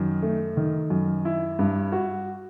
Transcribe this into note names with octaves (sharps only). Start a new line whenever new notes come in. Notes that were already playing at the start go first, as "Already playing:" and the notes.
Already playing: F#2 D#3
A3
D#3
F#2
E4
G2
F#4